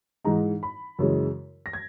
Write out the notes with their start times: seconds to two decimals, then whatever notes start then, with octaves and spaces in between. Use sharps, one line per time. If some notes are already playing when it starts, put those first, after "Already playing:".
0.24 G#2 E3 G#3 D#4 A#5
0.63 B5
0.99 F#2 C#3 E3 G#3
1.66 A#6
1.73 G#6